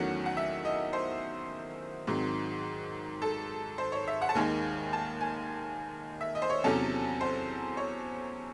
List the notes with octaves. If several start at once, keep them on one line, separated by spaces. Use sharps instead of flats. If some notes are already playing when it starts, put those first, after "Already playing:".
Already playing: E2 D#3 F#3 A3 C#4 F#5
F#5
E5
D#5
C5
G#2 D#3 F#3 C4
A4
C5
C#5
E5
F#5
A5
D#2 D#3 G#3 G#5
A5
G#5
E5
D#5
C5
C#5
E2 C3 F#3 C#4 A4
C5
C#5